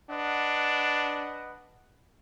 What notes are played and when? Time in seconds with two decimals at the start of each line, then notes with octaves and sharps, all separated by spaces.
0.10 D4 B4 D#5 F#5